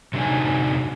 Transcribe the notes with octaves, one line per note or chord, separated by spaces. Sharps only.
C3 F#3 D4 D#4 G#5